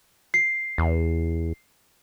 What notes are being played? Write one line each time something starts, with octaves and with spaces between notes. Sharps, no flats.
C7
E2